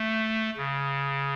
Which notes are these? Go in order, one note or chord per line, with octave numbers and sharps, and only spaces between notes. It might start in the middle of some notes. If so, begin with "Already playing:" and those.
Already playing: A3
C#3